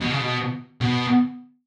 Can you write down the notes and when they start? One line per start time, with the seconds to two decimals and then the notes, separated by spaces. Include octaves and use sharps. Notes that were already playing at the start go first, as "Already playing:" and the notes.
0.01 B2
0.10 C#3
0.18 B2
0.81 B2